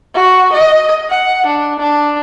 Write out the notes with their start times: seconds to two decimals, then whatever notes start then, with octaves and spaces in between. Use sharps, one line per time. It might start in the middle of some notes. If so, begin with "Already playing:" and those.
0.14 F#4
0.53 D#5
1.10 F#5
1.46 D4
1.80 D4